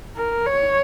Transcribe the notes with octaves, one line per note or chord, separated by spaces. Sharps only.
A#4
C#5